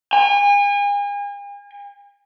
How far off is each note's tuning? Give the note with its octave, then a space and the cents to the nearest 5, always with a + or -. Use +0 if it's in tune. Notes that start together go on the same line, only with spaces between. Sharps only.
G#5 -40